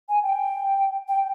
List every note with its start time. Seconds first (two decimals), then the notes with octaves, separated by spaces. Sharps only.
0.09 G#5
0.23 G5
1.08 G5